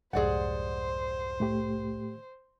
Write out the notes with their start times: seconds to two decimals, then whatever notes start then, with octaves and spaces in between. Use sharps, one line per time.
0.13 C2 F2 G#2 G#4 C5 D5 F#5
1.40 A2 A3 G4